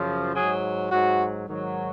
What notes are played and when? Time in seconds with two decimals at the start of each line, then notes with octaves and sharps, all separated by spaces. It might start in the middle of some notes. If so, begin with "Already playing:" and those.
Already playing: F#2 C#3 F3
0.35 G#2 F#3 G#4
0.90 G#2 F#3 F#4
1.47 G#2 D#3 F#3